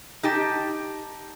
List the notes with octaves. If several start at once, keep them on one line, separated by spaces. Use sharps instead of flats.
D#4 G4 A5